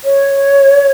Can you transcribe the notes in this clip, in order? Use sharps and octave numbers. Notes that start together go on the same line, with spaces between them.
C#5